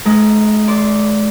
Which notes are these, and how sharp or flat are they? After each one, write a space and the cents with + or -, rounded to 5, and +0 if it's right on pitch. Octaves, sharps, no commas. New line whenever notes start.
G#3 +45 D#4 +0
D5 -15 C6 +0